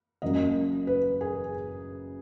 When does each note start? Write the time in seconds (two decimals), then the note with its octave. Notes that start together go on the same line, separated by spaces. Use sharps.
0.22 F#1 F#2 C#3 F#3 D#5
0.87 B4
1.21 G#4